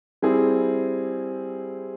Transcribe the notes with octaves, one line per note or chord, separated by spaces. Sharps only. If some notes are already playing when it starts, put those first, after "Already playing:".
G3 C4 E4 G#4